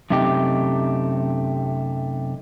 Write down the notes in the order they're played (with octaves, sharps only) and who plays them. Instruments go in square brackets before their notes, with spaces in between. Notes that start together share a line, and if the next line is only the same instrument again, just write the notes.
[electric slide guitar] F#2 C3 A3 D#4 G4